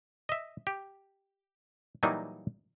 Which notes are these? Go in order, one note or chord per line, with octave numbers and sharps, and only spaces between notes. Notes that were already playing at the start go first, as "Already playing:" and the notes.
D#5 E5
G4
A#2 E3 F#3 G3 A#3 D#4